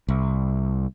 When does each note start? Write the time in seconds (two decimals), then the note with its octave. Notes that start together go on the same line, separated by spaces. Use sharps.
0.09 C2